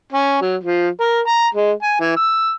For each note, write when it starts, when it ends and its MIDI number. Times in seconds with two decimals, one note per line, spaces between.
0.13 0.41 61
0.41 0.57 54
0.63 0.89 53
1.00 1.20 70
1.27 1.46 82
1.55 1.72 56
1.82 1.95 80
2.00 2.13 52
2.16 2.53 88